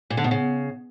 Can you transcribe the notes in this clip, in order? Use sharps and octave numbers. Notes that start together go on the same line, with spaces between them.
A#2
D3
B2
C#3